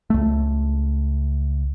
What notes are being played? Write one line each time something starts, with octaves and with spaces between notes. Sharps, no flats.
C#2 A3